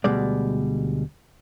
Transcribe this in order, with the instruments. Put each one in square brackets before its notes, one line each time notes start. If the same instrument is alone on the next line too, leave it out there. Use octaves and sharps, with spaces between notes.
[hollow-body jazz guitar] D2 B2 G3 G#3 D5